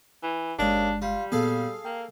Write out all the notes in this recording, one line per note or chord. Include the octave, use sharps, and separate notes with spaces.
E3
G1 D#2 G#3 D4 C#5
G3 F4
A#2 B3 G#4 A4 F5
A#3 G5